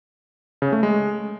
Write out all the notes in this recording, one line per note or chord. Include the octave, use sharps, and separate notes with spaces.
C#3
A3
G#3